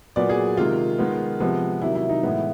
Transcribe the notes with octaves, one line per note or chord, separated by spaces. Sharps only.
A#2 F#3 B3 D5
G#4
C3 D#3 G#3 F4
D#3 G#3 B3
C3 F3 G#3 B3
C3 D#3 F#3 E4
E4
D#4
A2 E3 G#3 B3 E4